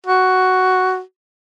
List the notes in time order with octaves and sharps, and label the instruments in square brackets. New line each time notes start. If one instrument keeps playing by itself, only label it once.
[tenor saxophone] F#4